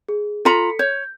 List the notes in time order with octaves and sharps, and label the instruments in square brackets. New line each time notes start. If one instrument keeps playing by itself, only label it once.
[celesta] G#4
[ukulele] F4 A#5 B5 [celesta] A4 B6 C#7
[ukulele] C#5 [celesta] G6